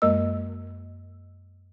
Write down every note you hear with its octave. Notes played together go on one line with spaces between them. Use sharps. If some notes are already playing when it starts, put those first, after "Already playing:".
F#2 G#3 A#3 A#4 D#5 E6